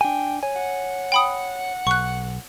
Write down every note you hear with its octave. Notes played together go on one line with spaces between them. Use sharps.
D4 G5 G#5
C#5 G#5
F#5
G5 B5 D#6
B1 C#6 F#6